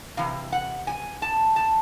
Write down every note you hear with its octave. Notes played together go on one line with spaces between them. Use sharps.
C3 E3 F5
F#5
G#5
A5
A5